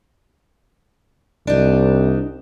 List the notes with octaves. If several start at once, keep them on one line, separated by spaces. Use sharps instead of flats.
C2 D4 D#4